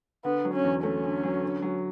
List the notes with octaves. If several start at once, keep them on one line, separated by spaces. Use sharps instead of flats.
D3 B3
F#3
C#4
E2
A3 C#4
D3
F#3
D3
F#3